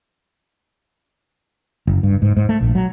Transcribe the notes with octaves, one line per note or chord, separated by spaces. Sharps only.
F#1
G2
G#2
G#2
A3
A#1
F#3